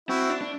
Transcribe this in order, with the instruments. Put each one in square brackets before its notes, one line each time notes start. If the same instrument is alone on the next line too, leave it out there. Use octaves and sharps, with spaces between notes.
[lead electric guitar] C4 [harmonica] E4 F#4
[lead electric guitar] D4
D4